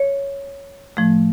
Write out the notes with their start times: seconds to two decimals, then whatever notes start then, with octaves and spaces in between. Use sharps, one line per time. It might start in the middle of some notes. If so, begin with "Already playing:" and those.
Already playing: C#5
0.97 A2 F3 A3